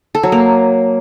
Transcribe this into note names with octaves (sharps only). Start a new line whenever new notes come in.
A4
F#3
A#3